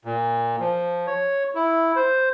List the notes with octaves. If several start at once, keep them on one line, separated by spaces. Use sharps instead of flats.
A#2
F3
C#5
E4
C5